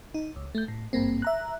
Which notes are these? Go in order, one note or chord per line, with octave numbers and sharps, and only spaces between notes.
D#4
C#2
A3 G6
A2
G#1 G2 A#3 C4
E5 A#5 F#6